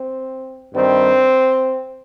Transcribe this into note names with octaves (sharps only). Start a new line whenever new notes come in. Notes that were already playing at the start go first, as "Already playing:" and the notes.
Already playing: C4
G2 D#3 G3 C4